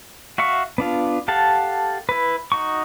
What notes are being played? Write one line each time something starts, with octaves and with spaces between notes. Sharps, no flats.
F#4 E5 F5 C#6
B3 D4 F4
G4 A4 F5 F#5 A5
E4 B4
D#4 F#4 C#6